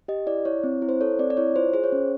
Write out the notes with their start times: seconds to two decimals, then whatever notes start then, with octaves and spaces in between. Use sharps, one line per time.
0.08 G4 D#5
0.27 E4 D5
0.45 E4 C#5
0.64 C4
0.82 E4
0.89 C5
1.01 A4 C#5
1.19 C4 D5
1.30 D5
1.37 E4 C#5
1.56 F4 C5
1.74 G#4 C5
1.84 C#5
1.92 C#4